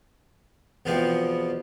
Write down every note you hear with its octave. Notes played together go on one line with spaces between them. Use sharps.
E2 B2 F3 B3 C4